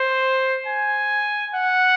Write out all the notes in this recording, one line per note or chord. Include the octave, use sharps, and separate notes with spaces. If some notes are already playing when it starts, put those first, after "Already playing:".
Already playing: C5
G#5
F#5